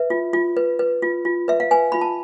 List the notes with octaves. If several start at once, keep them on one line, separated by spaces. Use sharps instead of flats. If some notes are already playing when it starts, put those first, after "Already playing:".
Already playing: B4 E5
F4
F4
B4
B4
F4
F4
B4 E5
F5
B4 G#5
F4 B5
A5